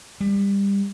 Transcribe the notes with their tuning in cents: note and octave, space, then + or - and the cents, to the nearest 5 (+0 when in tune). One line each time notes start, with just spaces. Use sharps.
G3 +25